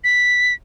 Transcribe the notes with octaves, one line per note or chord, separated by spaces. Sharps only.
B6